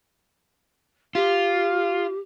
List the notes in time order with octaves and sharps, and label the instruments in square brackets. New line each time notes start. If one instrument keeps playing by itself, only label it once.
[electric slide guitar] F4 [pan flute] G4